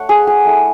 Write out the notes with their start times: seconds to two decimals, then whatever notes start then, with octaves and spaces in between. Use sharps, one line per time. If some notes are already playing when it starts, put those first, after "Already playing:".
Already playing: A3 D4 C#5 F#5
0.09 G#4
0.27 G#4
0.45 A3 E4